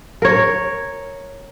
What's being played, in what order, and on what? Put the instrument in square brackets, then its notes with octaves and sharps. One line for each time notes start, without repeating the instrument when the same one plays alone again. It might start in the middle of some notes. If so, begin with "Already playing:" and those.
[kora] A#4 C#5